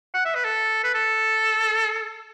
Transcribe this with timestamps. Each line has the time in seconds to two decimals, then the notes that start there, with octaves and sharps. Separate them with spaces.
0.15 F#5
0.25 E5
0.35 B4
0.45 A4
0.84 B4
0.94 A4